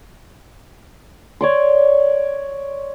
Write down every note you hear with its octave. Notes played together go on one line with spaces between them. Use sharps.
C#5 D5 C6